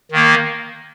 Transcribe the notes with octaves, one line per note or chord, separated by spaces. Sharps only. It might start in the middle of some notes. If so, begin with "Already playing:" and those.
D#3 A#3